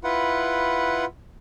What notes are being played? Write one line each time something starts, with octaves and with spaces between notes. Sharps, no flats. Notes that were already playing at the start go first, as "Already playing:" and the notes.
E4 F4 B4 F#5